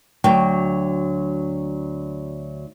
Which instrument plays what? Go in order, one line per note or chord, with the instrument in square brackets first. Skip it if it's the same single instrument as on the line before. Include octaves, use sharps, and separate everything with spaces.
[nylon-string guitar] D2 F#3 G5